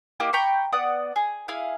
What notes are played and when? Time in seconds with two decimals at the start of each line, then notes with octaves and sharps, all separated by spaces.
0.20 A#3 E4 G4 D#5
0.33 G5 A#5 B5 C#6
0.72 B3 D5 F#5 D#6
1.16 G#4
1.48 E4 G#4 F5